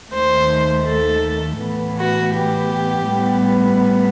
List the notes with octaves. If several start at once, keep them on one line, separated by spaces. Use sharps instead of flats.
D#2 D#3 A3 C5
A4
A2 E3 B3
F#4
G4
A2 G3 B3